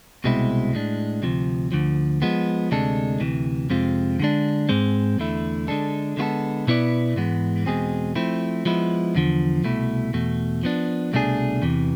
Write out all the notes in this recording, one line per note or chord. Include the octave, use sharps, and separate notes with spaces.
C2 B2 G#3 C4 E4
A2 G#3 D4
D2 C3 F3
D2 D3 F3
F3 G#3 B3
D2 C3 G#3 D4 A4
D2 C3 E3
F2 C3 G#3 C4 F4
D3 G#3 D4
G#2 G#3 C4
E2 D3 A3 E4
D3 G#3 D4 A4
D3 G#3 B3 F4 A4
B2 B3 E4 B4 D5
G#2 E3 G#3 B3
E2 B2 G#3 C4 G#4
F3 A3 C4 E4
F3 G#3 B3 E4
E2 D3 F3
C2 B2 A3 E4
E2 B2 A3
F3 B3 D4
C2 B2 A3 D4 G#4
E2 C3 E3